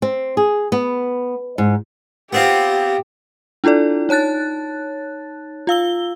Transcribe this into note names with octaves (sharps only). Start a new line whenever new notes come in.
C4
G#4
B3
G#2
B3 C4 F4 G4
D4 E4 F4 A4 D5
D#4 C#5 A5 F#6 A6
F4 F5 E6 G7